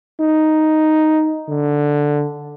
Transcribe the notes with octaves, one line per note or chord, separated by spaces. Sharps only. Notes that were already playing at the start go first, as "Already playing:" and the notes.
D#4
D3